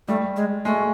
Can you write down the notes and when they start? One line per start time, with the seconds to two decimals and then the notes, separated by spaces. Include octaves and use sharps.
0.08 G3 A3
0.36 G#3
0.65 G#3 A3